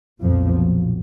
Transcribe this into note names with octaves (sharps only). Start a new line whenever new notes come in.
B1 F2 A#2 F3